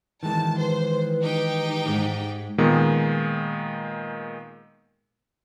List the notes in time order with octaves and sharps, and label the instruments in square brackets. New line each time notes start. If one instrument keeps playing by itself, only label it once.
[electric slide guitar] D#3 E3 G#3 [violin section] A5
[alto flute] B4 [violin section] C5
[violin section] D#4 G4 G5
[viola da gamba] G#2
[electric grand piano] A#2 D#3 G#3 B3